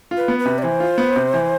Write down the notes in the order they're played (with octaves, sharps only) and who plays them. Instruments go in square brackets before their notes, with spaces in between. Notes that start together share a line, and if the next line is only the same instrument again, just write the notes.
[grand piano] F4
[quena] B4
[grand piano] B3
[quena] B4
[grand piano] C3
[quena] D5
[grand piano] E3 [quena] C5
[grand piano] F4
B3
C3
E3